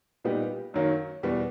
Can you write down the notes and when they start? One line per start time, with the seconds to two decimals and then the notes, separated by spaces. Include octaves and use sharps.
0.25 A#2 G3 B3 D#4 G4
0.74 F#2 D#3 F#3 A#3
1.23 E2 B2 G3 B3